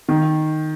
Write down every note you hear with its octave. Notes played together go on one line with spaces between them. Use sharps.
D#3